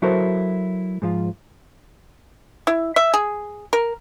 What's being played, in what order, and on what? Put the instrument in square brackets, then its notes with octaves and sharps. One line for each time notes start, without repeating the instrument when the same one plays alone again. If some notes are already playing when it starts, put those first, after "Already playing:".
[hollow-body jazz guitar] F#3 E4 F#4 A4 A#4 C5
G#2 F3 F4
[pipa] E4
E5
G#4
A#4